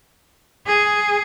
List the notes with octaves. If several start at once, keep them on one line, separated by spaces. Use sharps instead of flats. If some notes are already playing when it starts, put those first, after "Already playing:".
G#4